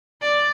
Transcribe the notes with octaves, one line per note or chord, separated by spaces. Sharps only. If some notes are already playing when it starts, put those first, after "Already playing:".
D5